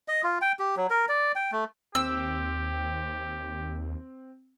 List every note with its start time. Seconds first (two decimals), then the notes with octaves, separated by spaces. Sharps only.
0.08 D#5
0.24 F4
0.41 G5
0.59 G4
0.77 F#3
0.90 A#4
1.09 D5
1.36 G5
1.52 A3
1.95 D#2 C4 G4 G5 E6